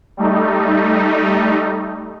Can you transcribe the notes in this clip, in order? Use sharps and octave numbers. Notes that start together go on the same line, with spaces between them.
G3 A3 D#4